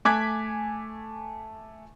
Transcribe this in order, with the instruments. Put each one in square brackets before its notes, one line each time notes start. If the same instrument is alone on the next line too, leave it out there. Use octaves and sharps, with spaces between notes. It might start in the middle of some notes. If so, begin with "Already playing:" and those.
[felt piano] A3 G#5 D6 F#6 G#6 B6